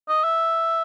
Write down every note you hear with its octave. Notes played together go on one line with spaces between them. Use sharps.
D#5
E5